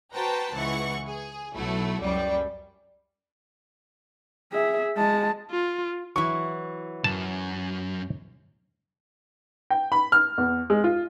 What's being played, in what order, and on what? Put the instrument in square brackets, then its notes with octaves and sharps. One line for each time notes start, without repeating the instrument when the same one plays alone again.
[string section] F#4 B4 C5 G5 A5 A#5
C#2 E3 F#5 C#6
G#4
B1 F#3 A3 E4 F#4
C#2 F#2 G3
[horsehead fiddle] G#4 E5
G#3 A5
[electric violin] F4
[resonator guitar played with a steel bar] E3 F#3 [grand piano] C#6
[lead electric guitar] F#2 [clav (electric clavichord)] A5
[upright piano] G5
B5
F6
E2
G#3
F4